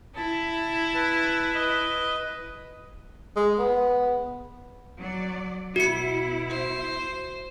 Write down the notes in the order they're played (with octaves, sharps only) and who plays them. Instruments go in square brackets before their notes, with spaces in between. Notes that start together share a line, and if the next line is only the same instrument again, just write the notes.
[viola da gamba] E4 [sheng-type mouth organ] A5
[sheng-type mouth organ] B4 A5
B4 D#5
[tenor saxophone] G#3
B3
[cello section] F#3 D5
[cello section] B2 E4 [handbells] F#4 C#7
[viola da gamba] C5